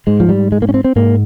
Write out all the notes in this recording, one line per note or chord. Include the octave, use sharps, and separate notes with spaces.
G#2 G#3
F3
G3
G#3
A#3
C#4
C4
C4
G#2 A#3